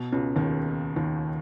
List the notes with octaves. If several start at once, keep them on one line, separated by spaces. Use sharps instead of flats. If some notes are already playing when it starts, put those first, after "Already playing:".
Already playing: B2
C#2 C#3
D#2 D#3
D#2 D#3